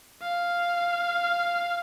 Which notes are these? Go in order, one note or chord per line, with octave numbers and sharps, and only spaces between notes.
F5